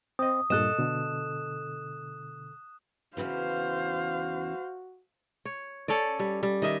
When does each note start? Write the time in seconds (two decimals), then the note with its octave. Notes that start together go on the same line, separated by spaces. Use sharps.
0.19 C4 D#5 D#6
0.50 G2 A#2 A4 D#5 F#6 E7
0.79 B2 D3
3.17 E2 C#3 E3 F#4 C5 F5
5.45 C#5
5.88 C#4 A4 C#5 D5
6.20 G3
6.43 G3
6.62 D#3 D#5 E5